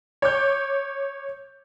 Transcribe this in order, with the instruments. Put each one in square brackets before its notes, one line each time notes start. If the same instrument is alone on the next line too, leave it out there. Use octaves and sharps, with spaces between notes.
[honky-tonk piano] C#5 D6 G6